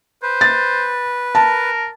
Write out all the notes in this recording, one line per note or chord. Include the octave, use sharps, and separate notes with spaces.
B4 C5
A6
A#4 A5